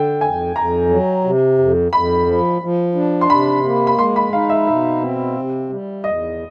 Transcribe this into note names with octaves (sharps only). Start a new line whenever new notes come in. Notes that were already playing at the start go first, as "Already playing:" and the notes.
Already playing: D3 G5
F2 G#5
F2 A#5
F#3
C3
F2
F2 B5
F3
F3
D4
C6
C3 B5
A#3
B5
G#3 C6
B5
D#4 F5
E5
B2 E5
C4
C3
G3
E2 D#5